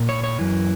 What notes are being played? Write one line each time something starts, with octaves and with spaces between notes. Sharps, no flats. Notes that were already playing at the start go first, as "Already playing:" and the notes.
Already playing: A#2
C#5
C#5
F#2 E3